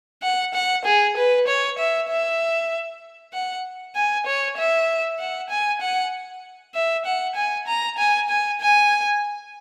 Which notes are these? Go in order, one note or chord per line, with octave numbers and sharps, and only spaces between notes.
F#5
F#5
G#4
B4
C#5
E5
E5
F#5
G#5
C#5
E5
F#5
G#5
F#5
E5
F#5
G#5
A#5
G#5
G#5
G#5